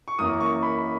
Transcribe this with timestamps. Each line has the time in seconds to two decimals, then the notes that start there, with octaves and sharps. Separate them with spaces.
0.08 C#6
0.19 F#2 E3 A#3 D#6
0.40 C#6
0.63 B5